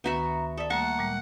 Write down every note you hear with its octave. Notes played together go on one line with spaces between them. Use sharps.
D2 D#3 B3 F#4 E5 A#5
A4 D5 E5 D#6
G3 A3 A#3 F#5 A#5 C#6
A#2 G3 G#3